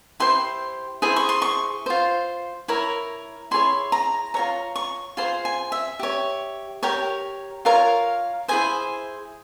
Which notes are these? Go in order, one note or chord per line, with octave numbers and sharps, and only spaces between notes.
E4 G4 C5 C6
E4 G#4 C5
C#6
C6
C#6
F4 C5
E4 A#4 C#5
E4 G#4 C#5 C6
A#5
F4 A#4 C#5 A#5
C#6
F4 G#4 C5 C6
G#5
E5
G4 C#5
G4 A#4 C#5
F4 A#4 C#5 F5
E4 G#4 C5 G#5